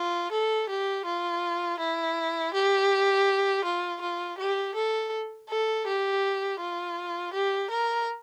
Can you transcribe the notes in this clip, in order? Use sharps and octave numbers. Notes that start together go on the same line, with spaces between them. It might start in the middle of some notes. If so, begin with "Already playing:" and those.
Already playing: F4
A4
G4
F4
E4
G4
F4
F4
G4
A4
A4
G4
F4
G4
A#4